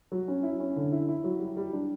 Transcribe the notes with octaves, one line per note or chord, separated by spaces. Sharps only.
F#3
C#4
E4
C#4
D3
E4
E4
F#3
G3
G3
D4